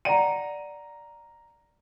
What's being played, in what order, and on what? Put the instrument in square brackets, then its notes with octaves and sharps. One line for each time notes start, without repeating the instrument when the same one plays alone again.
[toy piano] D5 F#5 G5 [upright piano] A#5 D#7